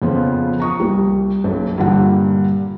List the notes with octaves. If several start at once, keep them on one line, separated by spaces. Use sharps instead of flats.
F2 C#3 F3 B3 F4 C5
A#5 C#6 D#6
C2 G3
F#1 B1 F#2
G2 A#2 D3 G4 F#5 A#5